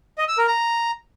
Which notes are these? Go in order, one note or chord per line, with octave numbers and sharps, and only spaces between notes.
D#5
E6
A#4
A#5